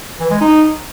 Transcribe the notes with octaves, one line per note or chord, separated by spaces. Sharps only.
E3
G#3
D#4